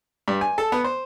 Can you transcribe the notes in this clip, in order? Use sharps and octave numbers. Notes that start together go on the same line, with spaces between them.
G2
G#5
A4
B3
C5